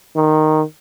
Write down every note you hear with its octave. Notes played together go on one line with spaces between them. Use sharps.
D#3